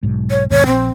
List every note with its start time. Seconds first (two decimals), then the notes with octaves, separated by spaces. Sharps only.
0.03 B1 G#2
0.30 C#5
0.51 D#2 G#2 B2 C#5
0.66 A#1 C4